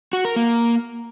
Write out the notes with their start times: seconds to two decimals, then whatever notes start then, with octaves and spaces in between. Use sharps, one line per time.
0.13 F#4
0.25 A#4
0.36 A#3